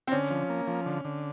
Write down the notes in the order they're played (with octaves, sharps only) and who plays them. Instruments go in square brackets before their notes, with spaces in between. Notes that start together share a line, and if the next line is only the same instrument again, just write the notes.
[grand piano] C4
[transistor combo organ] D3 [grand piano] C#4
[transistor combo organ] F3
A#3
F3
D3
D3